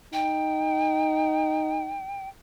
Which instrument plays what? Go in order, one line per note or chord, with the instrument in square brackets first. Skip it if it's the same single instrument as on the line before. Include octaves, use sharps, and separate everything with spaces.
[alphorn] D#4 [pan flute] G5